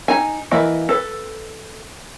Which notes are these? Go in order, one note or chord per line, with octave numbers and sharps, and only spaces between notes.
D#4 G#5
E3 A#3 B4 D#5
A4 B4